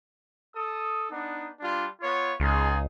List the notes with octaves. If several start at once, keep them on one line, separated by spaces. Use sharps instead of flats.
A4 D#6
B3 D4 D#4
G3 D4 F4
B3 F4 C#5
C#2 D#4 F4 G#4